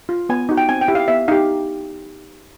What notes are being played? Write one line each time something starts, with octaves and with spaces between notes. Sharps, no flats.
F4
B3 G#5
D#4 F#4
G5
C4 G#5
G5
E4 G4
F5
B3 E5
D#4 G4 F5